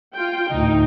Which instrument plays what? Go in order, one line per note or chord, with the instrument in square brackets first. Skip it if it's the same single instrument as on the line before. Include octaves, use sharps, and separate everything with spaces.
[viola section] F4 G5
[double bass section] D2 A2 [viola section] D#4